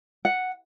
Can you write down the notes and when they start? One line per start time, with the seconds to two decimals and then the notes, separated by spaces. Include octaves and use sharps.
0.25 F#5